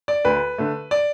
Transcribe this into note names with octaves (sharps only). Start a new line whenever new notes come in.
D5
D2 B4
D3 A3
D5